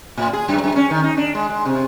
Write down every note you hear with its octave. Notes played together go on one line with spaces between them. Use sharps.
A2
G#4
F#2
F#2
C#4
D#3
D#4
D4
G#3
G#3
C3